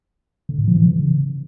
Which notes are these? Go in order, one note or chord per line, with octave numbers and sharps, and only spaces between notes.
D3
A2
F3
E3
C#3